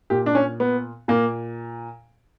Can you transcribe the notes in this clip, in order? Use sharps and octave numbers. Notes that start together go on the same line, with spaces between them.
A#2 G4
D4
C#4
B3
A#2 A#3